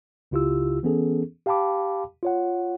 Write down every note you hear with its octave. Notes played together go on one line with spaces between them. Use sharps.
C#2 C#3 E4 F4 G4 E6
E3 B3 C#4 G#4 A4
G4 F5 G5 A5 B5 D6
F4 C#5 F#5